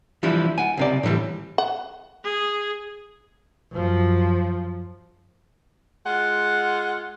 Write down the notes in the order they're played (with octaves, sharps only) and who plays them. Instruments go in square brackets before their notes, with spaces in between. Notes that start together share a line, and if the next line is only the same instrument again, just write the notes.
[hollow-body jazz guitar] E3 F3 G3 D4 E4
F#5 G#5
C#2 C3 D5
A2 D3 E3 G3
[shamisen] F#5
[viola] G#4
[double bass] F#2 F3
[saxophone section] G#3 F4 F#5